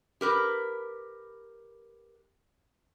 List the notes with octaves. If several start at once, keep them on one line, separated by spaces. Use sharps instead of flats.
G4 A#4 B4